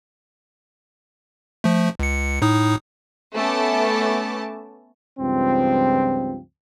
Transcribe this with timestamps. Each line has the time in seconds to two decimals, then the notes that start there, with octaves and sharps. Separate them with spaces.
1.64 F3 A3
1.99 C#2 C#7
2.42 A2 D#4 D#6
3.34 A3 B3 C#4 A5 D6
5.19 C#2 G2 F3 C4